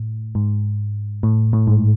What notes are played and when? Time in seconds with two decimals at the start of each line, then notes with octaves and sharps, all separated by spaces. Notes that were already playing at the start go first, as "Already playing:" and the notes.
Already playing: A2
0.35 G#2
1.23 A2
1.53 A2
1.67 G#2